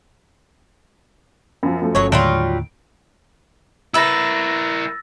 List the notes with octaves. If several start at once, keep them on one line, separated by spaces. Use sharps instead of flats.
F#2 F3
F#2 F3 A3
G1 F#3 C#5
D#2 A2 D3 F#3 G3 F4 D7
E4 A#4 B4 E5 E6 A6 A#6